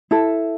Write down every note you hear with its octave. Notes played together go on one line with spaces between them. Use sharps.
E4 A4